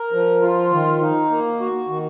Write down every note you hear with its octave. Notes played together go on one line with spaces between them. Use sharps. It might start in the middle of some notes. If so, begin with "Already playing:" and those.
Already playing: A#4
F3
F4
D#3
D#4
A#3
F#4
D#3